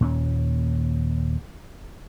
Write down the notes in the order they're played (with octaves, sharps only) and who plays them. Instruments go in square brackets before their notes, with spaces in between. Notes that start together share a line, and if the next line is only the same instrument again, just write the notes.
[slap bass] D#2 A#2 A3 C#4